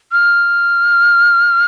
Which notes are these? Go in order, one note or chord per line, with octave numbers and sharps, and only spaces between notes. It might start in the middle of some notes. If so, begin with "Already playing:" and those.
F6